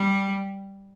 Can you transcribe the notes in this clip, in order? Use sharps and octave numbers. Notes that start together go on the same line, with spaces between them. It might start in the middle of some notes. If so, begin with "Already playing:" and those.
Already playing: G3